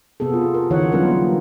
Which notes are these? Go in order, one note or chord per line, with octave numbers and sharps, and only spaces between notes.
C3 B3 G#4 A4
F4
A#4
D3 E3 D#4 C#5 F#5
F#3 G3 B3 C#4 F4 A#4
A#3